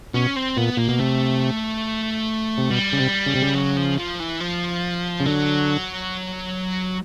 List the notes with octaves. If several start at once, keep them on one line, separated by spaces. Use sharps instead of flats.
B2 C#4
C4
A#2 B3
A#2 A#3
B2
C3 A3
C3
B2 G3
C#3
C3
C#3
C3
C#3
F#3
F3
F3
E3
F3
C#3
D3 F#3